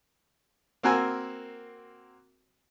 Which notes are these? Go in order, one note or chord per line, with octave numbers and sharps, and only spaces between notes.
A#3 C4 F#4 A#4 G#5 E6